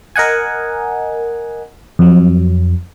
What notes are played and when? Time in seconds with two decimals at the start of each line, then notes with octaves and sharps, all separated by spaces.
0.16 A#4 D#5 F#5 G#5
1.99 F2 F#3